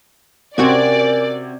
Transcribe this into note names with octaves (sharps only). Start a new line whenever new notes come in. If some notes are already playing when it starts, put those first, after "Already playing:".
C3 C4 C#4 F#4 A#4 D5 G#5 G#6